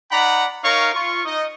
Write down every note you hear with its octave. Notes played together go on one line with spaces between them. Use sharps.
D#4 D5 F#5 A#5 B5
D#4 A#4 C#5 F5 A#5 C#6
F4 C#6
D#4 D#5